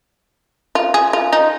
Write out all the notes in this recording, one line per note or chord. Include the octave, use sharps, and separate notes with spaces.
F4
G#4
F4
D#4